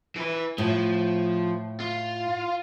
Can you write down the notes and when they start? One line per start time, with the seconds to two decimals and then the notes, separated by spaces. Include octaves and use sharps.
0.16 E3 B4
0.58 A2 F3
1.80 F4